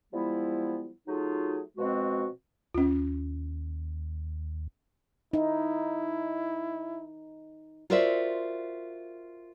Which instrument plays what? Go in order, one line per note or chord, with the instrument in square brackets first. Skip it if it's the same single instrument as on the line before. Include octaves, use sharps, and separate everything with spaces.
[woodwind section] F3 G3 G#3 B3 E4
F#3 A3 D#4 F4 F#4 G#4
B2 F3 G#3 C4 F#4
[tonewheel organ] D#2 [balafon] C#4 F4
[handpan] D#4 [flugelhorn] E4
[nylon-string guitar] F4 F#4 A#4 C5 D5 E5